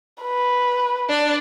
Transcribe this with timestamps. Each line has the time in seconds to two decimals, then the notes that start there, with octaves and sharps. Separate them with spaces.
0.22 B4
1.09 D4 D5